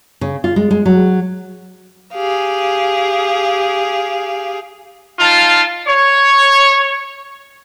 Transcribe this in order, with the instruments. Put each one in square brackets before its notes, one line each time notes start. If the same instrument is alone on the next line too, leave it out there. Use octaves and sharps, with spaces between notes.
[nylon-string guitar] C#3
F4
G#3
G#3
F#3
[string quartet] G4 G#4 F5
[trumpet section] D#4 F4 F5 A5
C#5